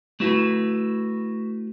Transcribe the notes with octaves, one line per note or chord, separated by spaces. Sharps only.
A3 E4 F#4 B4